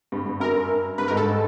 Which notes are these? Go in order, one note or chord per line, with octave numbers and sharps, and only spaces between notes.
G2
G2
F#2 A#4
G2 B4
G#2 A#4
A4